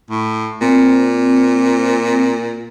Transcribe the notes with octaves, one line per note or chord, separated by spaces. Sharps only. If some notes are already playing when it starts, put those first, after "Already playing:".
A2
A#2 C4